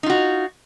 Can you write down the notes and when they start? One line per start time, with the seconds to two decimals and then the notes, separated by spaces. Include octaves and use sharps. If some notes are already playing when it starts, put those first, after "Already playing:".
0.03 D#4
0.06 F4
0.10 F#4